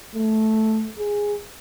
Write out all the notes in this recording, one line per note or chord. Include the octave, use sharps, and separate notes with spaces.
A3
G#4